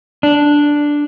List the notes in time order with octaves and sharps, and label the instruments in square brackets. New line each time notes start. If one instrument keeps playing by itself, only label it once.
[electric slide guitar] D4